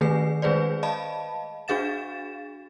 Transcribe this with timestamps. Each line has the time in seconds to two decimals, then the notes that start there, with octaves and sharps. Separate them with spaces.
0.01 D#3 A3 G#4 B4 C7
0.42 D#3 G#3 G#4 B4 C5 D5
0.83 D#5 F5 A5 B5
1.68 D4 F#4 G#4 F5 A6 E7